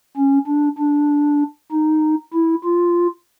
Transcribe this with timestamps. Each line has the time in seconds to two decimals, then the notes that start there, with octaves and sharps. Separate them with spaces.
0.16 C#4
0.47 D4
0.78 D4
1.72 D#4
2.33 E4
2.64 F4